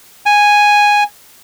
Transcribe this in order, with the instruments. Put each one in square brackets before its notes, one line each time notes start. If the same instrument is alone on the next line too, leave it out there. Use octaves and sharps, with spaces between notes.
[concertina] G#5